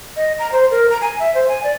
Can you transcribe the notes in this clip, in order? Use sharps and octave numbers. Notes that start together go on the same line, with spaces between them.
D#5
A#5
C5
A#4
A#5
G#5
E5
C5
G#5
D5